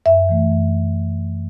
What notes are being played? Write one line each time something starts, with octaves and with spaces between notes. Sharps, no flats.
F#2 E5
E3 A3
F#2